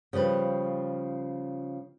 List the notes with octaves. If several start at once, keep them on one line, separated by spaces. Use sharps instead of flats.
C#3 F3 G3 B4